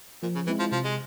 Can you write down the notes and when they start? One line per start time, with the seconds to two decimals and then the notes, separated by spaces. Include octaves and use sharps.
0.23 A#2 F3
0.35 C#3
0.47 E3 G#3 C4 E4
0.59 F3
0.72 C3 F3
0.84 G#3